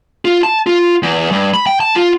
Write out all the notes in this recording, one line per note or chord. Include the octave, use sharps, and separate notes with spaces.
F4
A5
F4
E2
G2
B5
G5
A5
F4